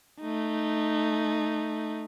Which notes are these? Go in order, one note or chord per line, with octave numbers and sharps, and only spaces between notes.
A3 D#4